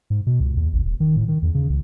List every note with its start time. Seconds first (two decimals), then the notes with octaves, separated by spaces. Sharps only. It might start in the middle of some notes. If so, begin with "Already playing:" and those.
0.10 G#2
0.27 B2
0.40 C#2
0.57 D#2
0.73 A1
0.85 D#1
1.00 D#3
1.17 A2
1.28 D#3
1.42 E2
1.55 C#3
1.70 C#2